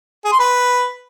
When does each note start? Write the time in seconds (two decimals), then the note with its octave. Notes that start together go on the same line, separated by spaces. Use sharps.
0.25 G#4
0.32 C6
0.40 B4